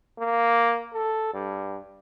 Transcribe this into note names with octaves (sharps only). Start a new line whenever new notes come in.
A#3
A4
G2